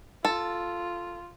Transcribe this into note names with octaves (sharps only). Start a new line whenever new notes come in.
F4 A4